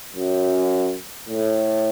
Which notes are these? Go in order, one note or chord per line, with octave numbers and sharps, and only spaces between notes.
F#2
A2